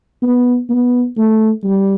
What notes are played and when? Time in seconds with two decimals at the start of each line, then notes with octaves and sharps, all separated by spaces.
0.23 B3
0.70 B3
1.17 A3
1.64 G3